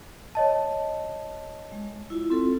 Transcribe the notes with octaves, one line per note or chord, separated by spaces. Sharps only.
C#5 D#5 A5
G#3
E4 F4
C4 F4 A4